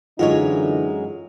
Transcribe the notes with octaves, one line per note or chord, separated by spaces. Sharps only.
F#2 D3 E3 G#3 D#4 F4 C#5